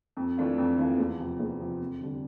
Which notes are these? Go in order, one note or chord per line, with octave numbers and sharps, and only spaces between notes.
F2
E3 A3 D4 F4
F2
E3 A3 D4 F4
E2
C3 F3
E2
C3 F3
F2
D3 G3 D4